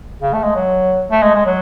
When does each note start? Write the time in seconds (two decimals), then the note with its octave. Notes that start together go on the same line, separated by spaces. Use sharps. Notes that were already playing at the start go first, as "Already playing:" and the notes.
0.22 C#3
0.33 A3
0.44 G#3
0.55 F#3
1.12 A3
1.22 G#3
1.35 G#3
1.46 F#3